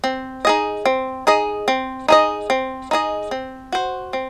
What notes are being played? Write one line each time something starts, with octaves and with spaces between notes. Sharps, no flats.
C4
D#4 G#4 D#5
C4
D#4 G#4 D#5
C4
D#4 G#4 D#5
C4
D#4 G#4 D#5
C4
F#4 C5
C4